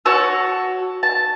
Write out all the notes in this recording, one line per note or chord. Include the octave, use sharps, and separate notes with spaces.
F#4 C#5 A5 E6
A5